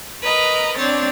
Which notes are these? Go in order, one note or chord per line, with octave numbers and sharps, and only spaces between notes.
A#4 B4 D#5 A#5
C4 D4 C#5 A6